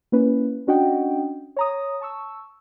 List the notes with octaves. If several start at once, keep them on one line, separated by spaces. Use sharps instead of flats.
A#3 C#4 E4 B4
C#4 D4 F#4 D#5 F#5 G5
C#5 A#5 D#6
A5 C#6 E6